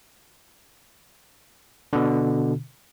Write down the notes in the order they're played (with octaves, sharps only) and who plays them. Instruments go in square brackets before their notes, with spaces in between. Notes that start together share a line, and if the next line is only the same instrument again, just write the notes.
[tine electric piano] B2 D3